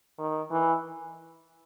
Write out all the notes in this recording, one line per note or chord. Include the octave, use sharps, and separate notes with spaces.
D#3
E3